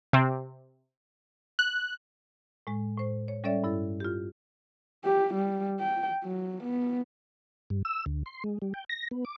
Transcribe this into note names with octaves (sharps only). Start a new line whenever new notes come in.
C3 C4
F#6
A2 G#3
A2 C5
C#5
G3 C#4 A4 C#5 D5 E5
G2 E4 A4
F4 G4
G4
G3
G5
F#3
B3
G2
E6
D2
C6
G#3
G3
G5
A#6
B3
D6